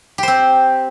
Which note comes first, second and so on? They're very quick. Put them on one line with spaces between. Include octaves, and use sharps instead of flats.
G4 C5 C4